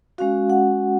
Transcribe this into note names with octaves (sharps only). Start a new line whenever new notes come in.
G#3 C#4 F#4 F5
F#5